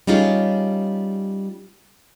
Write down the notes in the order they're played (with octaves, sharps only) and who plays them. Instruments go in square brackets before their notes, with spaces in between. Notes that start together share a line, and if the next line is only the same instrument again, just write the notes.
[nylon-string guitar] G3 C#4 D#4 F4 G#4